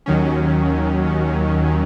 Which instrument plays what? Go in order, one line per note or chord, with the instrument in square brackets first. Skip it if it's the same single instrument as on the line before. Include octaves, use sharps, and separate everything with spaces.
[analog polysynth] D#2 D#3 F#3 C#4